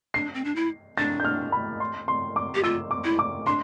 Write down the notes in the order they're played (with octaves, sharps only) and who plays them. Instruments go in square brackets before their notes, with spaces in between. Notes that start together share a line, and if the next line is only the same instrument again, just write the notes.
[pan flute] D4 [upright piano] C7
[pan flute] C4
D4
E4
[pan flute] D4 [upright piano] A6
[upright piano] G6
F6
B5
C6
C6
D6
[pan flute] G4
[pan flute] F4 [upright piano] E6
[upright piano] D6
[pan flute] E4
[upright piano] D6
[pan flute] D4 [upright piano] C6